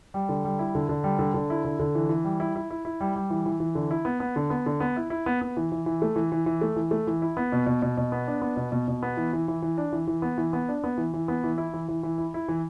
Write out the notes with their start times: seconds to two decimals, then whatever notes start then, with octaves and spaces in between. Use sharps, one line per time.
0.14 G3
0.29 D3
0.45 G3
0.59 E4
0.75 D3
0.89 D3
1.04 G3
1.19 D3
1.34 D3
1.50 E4
1.65 D3
1.80 D3
1.95 E3
2.09 E3
2.24 G3
2.40 E4
2.55 E4
2.70 E4
2.85 E4
3.00 G3
3.16 G3
3.30 E3
3.46 E3
3.60 E3
3.75 D3
3.91 E4
4.05 B3
4.20 B3
4.36 D3
4.50 B3
4.66 D3
4.80 B3
4.96 E4
5.10 E4
5.26 B3
5.41 B3
5.57 E3
5.72 E3
5.86 E3
6.02 A3
6.16 E3
6.32 E3
6.46 E3
6.61 A3
6.76 E3
6.91 A3
7.07 E3
7.22 E4
7.37 B3
7.52 B2
7.67 B2
7.82 B2
7.97 B2
8.12 B3
8.27 D4
8.42 B3
8.57 B2
8.72 B2
8.88 B2
9.03 B3
9.17 E3
9.33 E3
9.48 E3
9.62 E3
9.78 D4
9.92 E3
10.07 E3
10.22 B3
10.38 E3
10.53 B3
10.69 D4
10.84 B3
10.97 E3
11.14 E3
11.28 B3
11.44 E3
11.58 E4
11.73 E3
11.88 E3
12.03 E3
12.18 E4
12.34 E4
12.48 E3